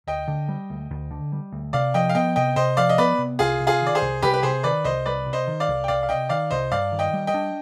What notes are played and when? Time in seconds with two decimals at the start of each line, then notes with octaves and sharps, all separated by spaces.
0.07 D2 D#5 G5
0.28 D3
0.48 G3
0.70 D2
0.90 D2
1.11 D3
1.32 G3
1.53 D2
1.73 C3 D5 F5
1.94 F3 D#5 G5
2.09 F5
2.15 B3 D#5 G5
2.36 C3 D#5 G5
2.56 C3 C5 D#5
2.77 F3 D5 F5
2.89 D#5
2.98 B3 B4 D5
3.18 C3
3.39 C2 F4 G#4
3.60 C3
3.67 F4 G#4
3.81 D#3
3.87 D5
3.95 G#4 C5
4.02 C2
4.22 C2 G4 B4
4.34 B4
4.43 C3 G#4 C5
4.63 D#3 B4 D5
4.84 C2 C5 D#5
5.06 C2 B4 D5
5.26 C3
5.33 C5 D#5
5.47 D#3
5.60 D5 F5
5.68 C2
5.84 G5
5.88 C2 D5 F5
6.03 F5
6.09 C3 D#5 G5
6.29 D#3 D5 F5
6.50 C2 C5 D#5
6.71 G2 D5 F5
6.92 D#3
6.99 D#5 G5
7.13 G3
7.27 D#5 G5
7.34 D4